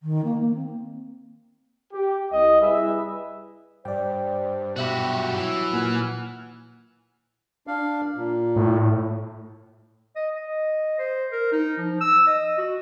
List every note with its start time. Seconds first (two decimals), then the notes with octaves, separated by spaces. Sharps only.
0.03 D#3
0.24 A#3
0.39 A#3
0.54 C4
1.93 G4
2.32 C2 D#5
2.62 G3 E4 G#4 B4 E5
3.85 G2 C5 D5 G5
4.76 B2 F#3 F#4 G4 E5 B5
5.35 E3
5.73 A#2 F#5 G#5 F6
7.67 D4 F5
8.16 A#2
8.56 A2
10.16 D#5
10.36 D#5
10.99 C5
11.32 A#4
11.52 D#4
11.78 F3
12.01 E6
12.27 D#5
12.58 F#4